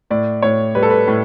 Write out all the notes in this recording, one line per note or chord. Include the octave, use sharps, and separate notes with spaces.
A2 D5
A2 C#5
G3 B4
A4
B4
A2